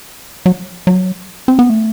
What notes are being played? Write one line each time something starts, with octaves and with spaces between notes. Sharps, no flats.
F#3
F#3
C4
B3
A3